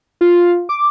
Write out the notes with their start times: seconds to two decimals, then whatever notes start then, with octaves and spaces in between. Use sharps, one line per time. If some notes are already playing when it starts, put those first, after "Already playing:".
0.21 F4
0.69 D6